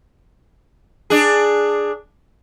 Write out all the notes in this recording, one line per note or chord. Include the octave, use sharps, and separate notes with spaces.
D4 G#4